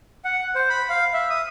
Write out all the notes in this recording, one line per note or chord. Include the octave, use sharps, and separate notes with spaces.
F#5
C5
B5
F5
E5
D#6